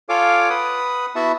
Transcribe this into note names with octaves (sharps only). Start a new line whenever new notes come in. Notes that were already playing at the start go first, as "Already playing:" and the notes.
F4 A4 C#5 F5 G#5 D6
B4 F#5 D#6
B3 E4 F#4 E5 F#5 A5